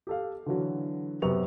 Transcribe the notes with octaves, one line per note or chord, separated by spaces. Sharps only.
G4 A4 F5
D3 E3 F#3
F#2 C3 B3 C#6 F7